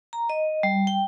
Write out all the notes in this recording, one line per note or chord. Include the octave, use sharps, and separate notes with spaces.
A#5
D#5
G3
G5